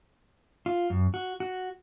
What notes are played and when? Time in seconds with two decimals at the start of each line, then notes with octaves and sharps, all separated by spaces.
0.66 F4
0.90 F#2
1.14 F#4
1.40 F#4